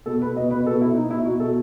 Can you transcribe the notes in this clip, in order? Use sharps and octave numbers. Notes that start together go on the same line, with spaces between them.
B2 A4
B2 B4
B2 D#5
B2 B4
B2 A4
B2 E4
B2 D#4
B2 E4
B2 F#4
B2 A4